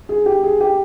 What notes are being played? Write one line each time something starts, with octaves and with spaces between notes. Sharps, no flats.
G#4
G4
G#4
G4